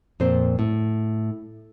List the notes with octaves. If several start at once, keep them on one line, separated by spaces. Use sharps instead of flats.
F2 A#2 C4 C5
A2